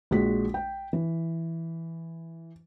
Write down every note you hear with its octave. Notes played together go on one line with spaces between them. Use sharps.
A#1 G#3 F#4 B6
G5
E3